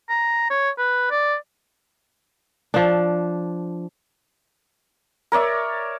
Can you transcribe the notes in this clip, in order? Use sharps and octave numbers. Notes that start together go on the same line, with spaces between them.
A#5
C#5
B4
D5
F3 D4
A#4 C#5 D5 E5